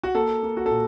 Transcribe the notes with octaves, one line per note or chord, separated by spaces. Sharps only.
F#4
A#3 A4
A#3
F#4
A#2 A4